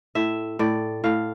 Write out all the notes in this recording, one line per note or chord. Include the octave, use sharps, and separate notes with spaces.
A2 E5
A2 D5
A2 F5